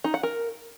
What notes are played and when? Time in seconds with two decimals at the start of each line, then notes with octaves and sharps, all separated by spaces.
0.04 D#4
0.14 F#5
0.23 A#4